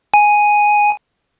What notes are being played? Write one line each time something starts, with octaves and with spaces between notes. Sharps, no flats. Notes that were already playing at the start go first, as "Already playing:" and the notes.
G#5